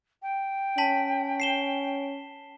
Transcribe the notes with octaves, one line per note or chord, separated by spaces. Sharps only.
G5
C#4 A5 B6 F#7
C7 E7 G7